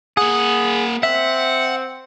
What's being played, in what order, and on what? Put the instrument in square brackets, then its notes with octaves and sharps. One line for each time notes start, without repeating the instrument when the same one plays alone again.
[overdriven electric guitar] A#3 F#5 [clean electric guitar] G#4
[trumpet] C4 [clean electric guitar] E5 [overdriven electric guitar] F#5